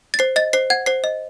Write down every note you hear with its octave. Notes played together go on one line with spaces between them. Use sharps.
A6
C5 C7
D#5 A6
C5 C7
F#5 G#6
C5 C7
D#5